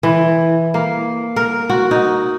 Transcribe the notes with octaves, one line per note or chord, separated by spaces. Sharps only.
E3
A#3
A#4
F#4
D#4